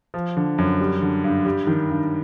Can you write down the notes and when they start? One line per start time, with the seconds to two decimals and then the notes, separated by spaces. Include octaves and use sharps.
0.14 F3
0.37 D3
0.58 F#2
0.80 G3
1.02 D3
1.24 G2
1.45 G3
1.67 D#3
1.90 G2